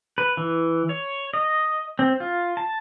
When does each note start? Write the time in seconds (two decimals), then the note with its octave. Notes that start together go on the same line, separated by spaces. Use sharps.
0.18 B4
0.37 E3
0.89 C#5
1.34 D#5
1.99 C4
2.20 F4
2.57 A5